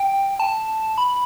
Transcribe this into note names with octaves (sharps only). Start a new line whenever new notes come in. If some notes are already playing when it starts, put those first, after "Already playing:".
Already playing: G5
A5
B5